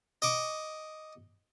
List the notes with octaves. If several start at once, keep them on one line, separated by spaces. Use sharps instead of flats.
D#5 C#6 D6